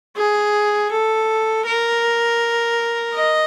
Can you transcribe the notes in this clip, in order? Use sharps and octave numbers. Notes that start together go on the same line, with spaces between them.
G#4
A4
A#4
D#5